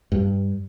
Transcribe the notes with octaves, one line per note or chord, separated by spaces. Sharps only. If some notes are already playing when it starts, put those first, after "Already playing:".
G2